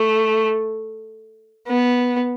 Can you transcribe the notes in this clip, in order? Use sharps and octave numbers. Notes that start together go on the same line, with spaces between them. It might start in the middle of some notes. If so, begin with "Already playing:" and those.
Already playing: A3
B3